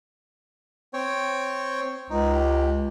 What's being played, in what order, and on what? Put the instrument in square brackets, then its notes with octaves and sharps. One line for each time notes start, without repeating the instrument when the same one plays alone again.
[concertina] C4 C#5 G5
[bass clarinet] C#2 [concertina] D#4
[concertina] G4